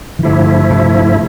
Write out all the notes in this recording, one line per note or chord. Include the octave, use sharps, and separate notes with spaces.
E3
G2 D3 F3 A3 E4
C3